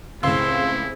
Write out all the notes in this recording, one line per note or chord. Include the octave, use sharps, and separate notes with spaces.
C#2 A2 C4 E4 G#4 F5 C6 E6